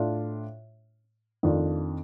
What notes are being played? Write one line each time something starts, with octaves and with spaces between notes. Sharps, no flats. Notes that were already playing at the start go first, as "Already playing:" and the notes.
Already playing: A2 A3 D4 F4
F2 D#3 A3 D4 F4